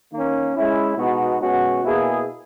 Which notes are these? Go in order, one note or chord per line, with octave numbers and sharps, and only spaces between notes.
D#3 A#3 C#4
G#3 C#4 E4
B2 G#3 B3 D#4 F#4
B2 G#3 C#4 F#4
B2 A#3 E4 G#4